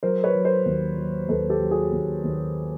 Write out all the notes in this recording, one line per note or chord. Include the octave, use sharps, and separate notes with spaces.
F#3 A#4 C5
B4 C#5
F#3
A#4 C5
D#2
F#3
D#2 A4 B4
G4 A4
F#3
F#4 G#4
D#2
D#2